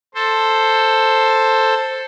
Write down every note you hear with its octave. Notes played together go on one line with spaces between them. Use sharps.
A4 C5